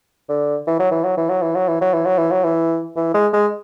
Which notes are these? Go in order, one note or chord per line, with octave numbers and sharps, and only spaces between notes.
D3
E3
F#3
E3
F#3
E3
F#3
E3
F#3
E3
F#3
E3
F#3
E3
F#3
E3
E3
G#3
G#3